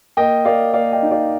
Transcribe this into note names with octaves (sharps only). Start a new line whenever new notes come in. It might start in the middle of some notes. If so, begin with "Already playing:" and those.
A#3 D#5 G5
A#3 D5 F5
A#3 D5 F5
D#5 G5
D#4
D5 F5